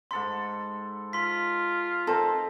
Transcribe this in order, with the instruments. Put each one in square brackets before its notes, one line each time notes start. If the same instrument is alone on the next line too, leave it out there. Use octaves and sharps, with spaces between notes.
[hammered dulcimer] G#2 A4 B5 [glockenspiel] C6
[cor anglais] F4 [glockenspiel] C6 B6
[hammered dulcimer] D#3 C4 [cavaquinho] A4